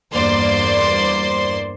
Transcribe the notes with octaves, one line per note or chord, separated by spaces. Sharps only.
E2 G2 A#3 C5 D5 C6